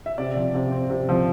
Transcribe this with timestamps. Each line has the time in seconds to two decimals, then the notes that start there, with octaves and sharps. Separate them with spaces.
0.06 E5
0.18 C3 D5
0.36 F3
0.54 C3
0.72 C4
0.90 C3
1.09 F3